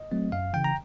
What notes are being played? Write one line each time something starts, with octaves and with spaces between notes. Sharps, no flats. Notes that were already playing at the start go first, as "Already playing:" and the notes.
Already playing: D#5
F#3 A3 C4
F#2 F5
C#3 E3 G5
A#5